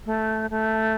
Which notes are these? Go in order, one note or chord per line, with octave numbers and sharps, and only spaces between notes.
A3
A3